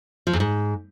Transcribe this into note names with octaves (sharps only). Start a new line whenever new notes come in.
F3
E2
G#2